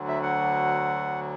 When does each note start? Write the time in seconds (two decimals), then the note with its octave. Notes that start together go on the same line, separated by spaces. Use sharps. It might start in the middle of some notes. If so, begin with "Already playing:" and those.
Already playing: D2 D3 F#3
0.08 E5
0.23 F#5